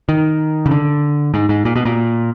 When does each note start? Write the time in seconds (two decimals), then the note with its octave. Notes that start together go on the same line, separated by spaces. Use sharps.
0.09 D#3
0.66 C#3
0.71 D3
1.34 G#2
1.49 G#2
1.65 A#2
1.76 B2
1.85 A#2